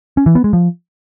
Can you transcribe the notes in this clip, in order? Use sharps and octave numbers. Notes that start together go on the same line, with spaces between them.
C#4
E3
B3
G#3
F3